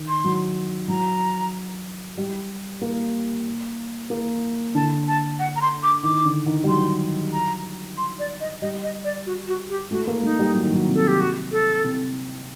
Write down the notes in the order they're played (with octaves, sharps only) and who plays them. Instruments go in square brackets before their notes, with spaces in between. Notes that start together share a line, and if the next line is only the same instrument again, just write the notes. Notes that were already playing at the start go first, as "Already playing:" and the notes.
Already playing: [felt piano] D#3
[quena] C6
[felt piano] F#3
[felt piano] F#3 [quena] A#5
[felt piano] G3
A#3
A#3
[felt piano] D3 [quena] A5
[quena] A5
F#5
A#5
C6
D6
[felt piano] D#3 [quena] D6
[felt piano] D3
D#3
G3
[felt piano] F#3 [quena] C6
[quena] A#5
C6
D5
D#5
[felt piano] G3 [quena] D#5
[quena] D#5
D5
F#4
F#4
G4
[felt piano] A3 [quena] F#4
[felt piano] A#3
[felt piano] A3 [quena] D#4
[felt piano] G3
F#3
D#3
F#3
C3
[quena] A4
G4
F#4
A4
[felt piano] C3